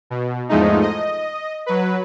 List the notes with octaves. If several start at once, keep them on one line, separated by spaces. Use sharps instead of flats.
B2
E2 G#2 F3 G#3 A3 D#4
D#5
F#3 B4